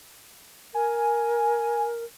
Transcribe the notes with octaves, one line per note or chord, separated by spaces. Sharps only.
A#4 G#5